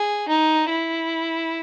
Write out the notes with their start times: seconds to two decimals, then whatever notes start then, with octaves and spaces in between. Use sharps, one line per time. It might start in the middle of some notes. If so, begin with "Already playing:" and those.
Already playing: G#4
0.29 D#4
0.69 E4